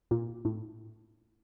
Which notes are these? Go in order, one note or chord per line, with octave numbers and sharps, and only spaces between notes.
A#2
A2